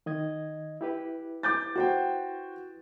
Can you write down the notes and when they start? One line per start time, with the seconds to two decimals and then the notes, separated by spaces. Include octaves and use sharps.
0.06 D#3 D#5 G#6
0.81 E4 G4 B4
1.43 D6 G6 A6
1.76 F#4 C5 G5